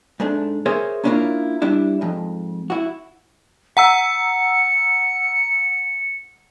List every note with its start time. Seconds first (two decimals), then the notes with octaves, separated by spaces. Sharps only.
0.20 G#2 A3 D4
0.66 G#4 A#4 C5 C#5 E5
1.04 A#3 C#4 D4 E4 F4 A#4
1.62 G3 D4 E4
2.01 F2 G#2
2.70 E4 F#4
3.77 F#5 A#5 E6 C#7